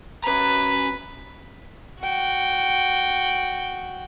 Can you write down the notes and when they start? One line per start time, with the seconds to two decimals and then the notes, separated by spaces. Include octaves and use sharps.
0.24 C#4 B4 A#5
2.00 F#4 G5